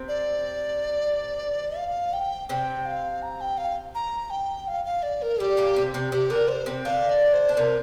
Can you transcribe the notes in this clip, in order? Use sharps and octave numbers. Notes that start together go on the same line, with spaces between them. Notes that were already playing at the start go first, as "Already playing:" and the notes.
Already playing: C3 C4
D5
F5
G5
C3 C4 G5
F5
A#5
G5
F5
A#5
G5
F5
F5
D5
A#4
G3 G4
A#2 A#3
C3 C4
C3 C4
C3 C4 G4
D3 D4 A#4
C5
C3 C4
D3 D4 F5
D5
C5
D4
C3 C4 A#4